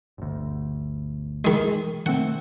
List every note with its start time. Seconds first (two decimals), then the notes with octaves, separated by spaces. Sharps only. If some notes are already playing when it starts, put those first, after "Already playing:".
0.18 G1 D2
1.45 D#3 G#3
2.06 D#3 A3 C4 F#5